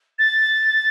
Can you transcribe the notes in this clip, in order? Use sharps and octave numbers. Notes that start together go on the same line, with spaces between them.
A6